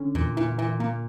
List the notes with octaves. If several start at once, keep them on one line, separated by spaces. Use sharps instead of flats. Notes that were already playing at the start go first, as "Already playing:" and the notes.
Already playing: D3 C#4
E2 A#2
A#2 E3
A#2 E3
A#2 A#3